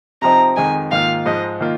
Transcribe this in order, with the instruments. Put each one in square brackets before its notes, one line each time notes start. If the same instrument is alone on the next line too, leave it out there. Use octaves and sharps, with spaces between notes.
[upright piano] C3 F3 C4 D#4 [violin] A#5
[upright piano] F2 D#3 G#3 D#4 [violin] G#5
[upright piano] G#2 D#3 A#3 F4 [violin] F5
[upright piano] G#2 F3 G#3 D#4 [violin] D#5
[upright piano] D#3 A#3 F4